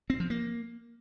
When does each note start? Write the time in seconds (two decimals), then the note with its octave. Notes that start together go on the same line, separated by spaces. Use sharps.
0.10 C4
0.20 F3
0.30 A#3